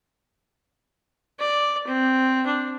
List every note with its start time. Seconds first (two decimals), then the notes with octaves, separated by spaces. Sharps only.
1.40 D5
1.87 C4
2.46 D4